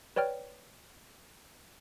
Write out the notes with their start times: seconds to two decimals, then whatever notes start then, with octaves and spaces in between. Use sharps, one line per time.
0.16 B4 C#5 D5 G5 F6